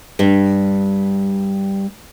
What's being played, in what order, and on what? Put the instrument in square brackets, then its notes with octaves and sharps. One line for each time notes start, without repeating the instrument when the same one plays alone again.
[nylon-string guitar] G2 G3